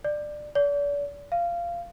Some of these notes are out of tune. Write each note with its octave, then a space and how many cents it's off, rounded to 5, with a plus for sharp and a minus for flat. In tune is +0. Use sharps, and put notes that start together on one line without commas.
D5 +20
D5 -40
F5 -20